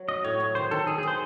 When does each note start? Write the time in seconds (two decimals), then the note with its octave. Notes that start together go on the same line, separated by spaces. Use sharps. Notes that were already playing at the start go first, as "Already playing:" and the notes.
Already playing: F#3
0.08 F#4 D#5
0.24 A2 C#5
0.40 F#3
0.55 D#3 C5
0.71 D#3 A4
0.87 D#3 G#4
0.98 G#4
1.03 D#3 C5